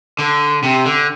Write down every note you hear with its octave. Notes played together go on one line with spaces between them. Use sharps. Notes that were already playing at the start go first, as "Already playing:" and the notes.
D3
C3
D3